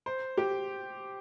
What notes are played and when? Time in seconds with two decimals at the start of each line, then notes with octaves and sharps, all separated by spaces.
0.06 C5
0.37 G4